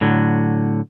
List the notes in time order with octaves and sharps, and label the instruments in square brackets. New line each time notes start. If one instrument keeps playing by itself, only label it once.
[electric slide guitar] A2 D3 F#3